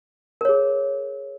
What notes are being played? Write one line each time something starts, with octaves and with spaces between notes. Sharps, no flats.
G#4 A#4 C#5